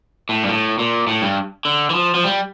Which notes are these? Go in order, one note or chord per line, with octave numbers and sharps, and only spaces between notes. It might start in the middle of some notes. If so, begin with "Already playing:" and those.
A2
G2
A2
A#2
A2
G2
D3
E3
F3
F3
G3